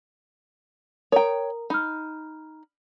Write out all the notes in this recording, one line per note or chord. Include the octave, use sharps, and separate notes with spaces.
A#4 C#5 G5 A#5
D#4 B5 F6